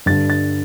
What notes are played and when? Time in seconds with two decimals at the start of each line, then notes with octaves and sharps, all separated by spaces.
0.06 G2 D3 A6
0.30 A6